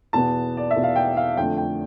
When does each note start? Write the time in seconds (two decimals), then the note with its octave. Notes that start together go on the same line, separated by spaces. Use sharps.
0.13 E2 B2 B3 A5
0.57 D5
0.71 E5
0.76 E2 B2 B3
0.83 F5
0.96 G5
1.17 F5
1.37 F2 D3 A3 G5
1.57 G5